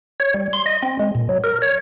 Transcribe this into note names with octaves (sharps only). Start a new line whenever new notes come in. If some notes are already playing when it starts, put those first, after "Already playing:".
C#5
G3
C6
D#5
C4
G#3
A#2
F#3
A#4
C#5